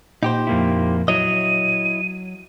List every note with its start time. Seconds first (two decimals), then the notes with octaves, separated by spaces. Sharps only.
0.23 A#2 D#4 G4 C5
0.47 F2 A#3 E4
1.08 F#3 E4 C#5 D#5 D#7